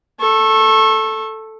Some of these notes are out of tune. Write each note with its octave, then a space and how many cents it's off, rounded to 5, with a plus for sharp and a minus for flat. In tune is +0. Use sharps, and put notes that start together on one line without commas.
A4 +0 C#6 -30